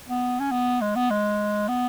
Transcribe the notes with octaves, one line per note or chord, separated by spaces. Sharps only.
B3
C#4
B3
G#3
B3
G#3
B3